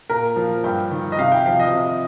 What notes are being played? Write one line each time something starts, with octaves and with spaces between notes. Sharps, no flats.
A#2 A#4
F3
G2 G5
D#3
D#5
C3 F5
G5
F3 F5
D#5
C3